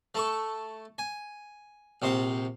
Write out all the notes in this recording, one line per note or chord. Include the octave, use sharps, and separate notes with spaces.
A3 A4 C#6
G#5
A#1 C3 C5 F5